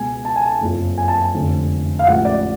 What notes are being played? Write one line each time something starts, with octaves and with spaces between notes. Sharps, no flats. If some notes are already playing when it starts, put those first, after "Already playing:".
Already playing: C#2 B2 G#5
A5
G#5
A5
F#1 F2 C#3 F3
G#5
A5
G#5
F1 F2 D3 F3
F5
A1 G#2 F3 F#5
D5